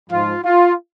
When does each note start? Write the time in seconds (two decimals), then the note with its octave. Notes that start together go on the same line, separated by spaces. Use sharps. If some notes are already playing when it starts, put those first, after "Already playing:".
0.10 G#2 F3 F4
0.43 F4